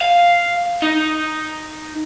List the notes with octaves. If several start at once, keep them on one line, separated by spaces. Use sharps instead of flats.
F5
D#4